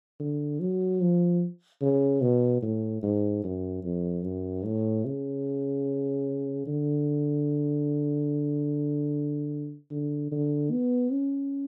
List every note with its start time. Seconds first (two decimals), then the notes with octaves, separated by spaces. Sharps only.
0.20 D3
0.60 F#3
1.01 F3
1.82 C#3
2.21 B2
2.62 A2
3.03 G#2
3.44 F#2
3.84 F2
4.24 F#2
4.65 A2
5.06 C#3
6.67 D3
9.91 D3
10.32 D3
10.72 B3
11.12 C#4